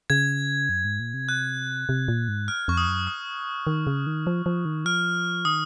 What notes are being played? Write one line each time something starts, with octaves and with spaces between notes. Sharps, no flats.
C#3 G#6
F#2
G#2
A#2
C3
F#6
C3
A#2
G#2
F6
F2 C#6
D#6
F#2
D#6
D#3
C#3
D#3
F3
F3
D#3
F3 F6
D#3 D#6